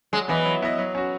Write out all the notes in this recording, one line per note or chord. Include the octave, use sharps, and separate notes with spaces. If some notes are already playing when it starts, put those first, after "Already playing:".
F#3 G#3
E3 B3 E4 B4 D#5
F#3
B3 E4 B4 D#5
F#3
C#4 F#4